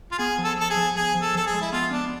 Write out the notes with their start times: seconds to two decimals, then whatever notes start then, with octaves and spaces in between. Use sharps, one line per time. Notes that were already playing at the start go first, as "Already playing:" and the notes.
0.12 F4
0.18 B3 G#4
0.38 F3
0.44 A4
0.57 B3 A4
0.70 G#4
0.76 F3
0.96 F3 G#4
1.15 F3
1.22 A4
1.34 F3 A4
1.46 G#4
1.53 G#3
1.61 E4
1.72 B3 F4
1.91 B3 D4